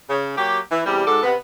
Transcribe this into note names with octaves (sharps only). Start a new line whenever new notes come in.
C#3
F#3 A#3 G4
E3
E2 C3 G3
G#2 F#4 G4 A4 D5
C3 B3